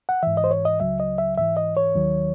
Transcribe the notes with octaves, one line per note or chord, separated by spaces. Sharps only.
F#5
G#2 E3 E5
D#5
C5
C#5
D#5
C#2 C#3 F#3 E5
D#5
E5
G#2 E3 E5
D#5
C#5
D#2 D#3 F#3